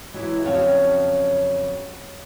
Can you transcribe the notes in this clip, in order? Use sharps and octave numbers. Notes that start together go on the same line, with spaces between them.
E3 F#3 G#3 E4
F2 C#3 F#3 C#5 F5 A5